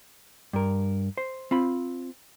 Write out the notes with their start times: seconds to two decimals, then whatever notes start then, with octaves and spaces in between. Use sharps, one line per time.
0.53 G2 A#4
1.17 C5
1.51 C4 F4 B5